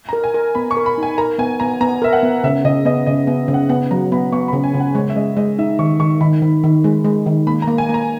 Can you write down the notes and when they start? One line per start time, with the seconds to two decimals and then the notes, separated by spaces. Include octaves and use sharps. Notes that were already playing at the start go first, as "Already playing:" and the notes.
0.09 A#5
0.13 A#4
0.24 G#5
0.34 A#4
0.55 B3 B5
0.71 C#6
0.77 A#4
0.86 B5
0.98 D#4 G#5
1.18 A#4 A#5
1.39 B3 G#5
1.60 B3 A#5
1.81 B3 A#5
2.02 A#4 E5
2.13 F#5
2.23 B3
2.44 C#3 E5
2.65 C#3 D#5
2.85 B3 D#5
3.06 C#3 D#5
3.27 B3
3.48 C#3
3.54 F#5
3.69 B3 F#5
3.91 F#3 A#5
4.12 B3 B5
4.32 B3 C#6
4.48 B5
4.53 C#3
4.64 G#5
4.74 C#3
4.80 F#5
4.95 G#3 C#5
5.09 E5
5.16 G#3 D#5
5.37 G#3 D#5
5.58 D#4 E5
5.79 D#3 C#6
6.00 D#3 C#6
6.21 D#3 B5
6.42 D#3
6.64 D#3
6.84 G#3
7.05 G#3
7.26 D#3
7.47 A#3 B5
7.62 A#5
7.68 A#3
7.78 G#5
7.89 A#3
7.94 A#5